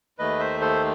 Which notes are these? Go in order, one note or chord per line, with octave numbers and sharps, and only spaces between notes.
D#2 D#3 A3 B4 D#5
C5 E5
A4 C5